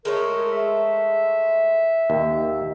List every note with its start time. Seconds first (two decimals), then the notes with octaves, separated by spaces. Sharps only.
0.05 G#3 A3 A#4 C#5
0.52 E5
2.10 D#2